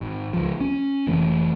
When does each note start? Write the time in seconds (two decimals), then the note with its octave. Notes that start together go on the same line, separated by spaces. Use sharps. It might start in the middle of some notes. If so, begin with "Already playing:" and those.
0.01 G#1
0.33 C#2 F3
0.61 C#4
1.07 F1 E3 A3